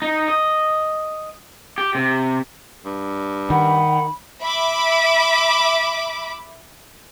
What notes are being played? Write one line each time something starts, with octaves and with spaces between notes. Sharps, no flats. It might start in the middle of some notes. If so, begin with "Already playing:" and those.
D#4
D#5
G4
C3
G2
D#3 F#5 B5
E5 B5 D6